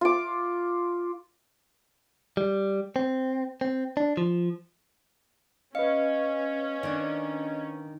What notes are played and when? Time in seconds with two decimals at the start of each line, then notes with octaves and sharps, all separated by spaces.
0.01 F4 D6
2.37 G3
2.96 C4
3.61 C4
3.97 D4
4.17 F3
5.75 C#4 B4 D#5 F5 C#7
6.83 D#3 D4